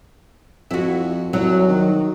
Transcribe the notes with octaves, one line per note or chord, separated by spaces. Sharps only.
F2 E4 F#4
C2 F#3
D#3